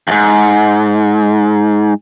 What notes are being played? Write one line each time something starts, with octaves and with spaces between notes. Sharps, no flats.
D#2 G#2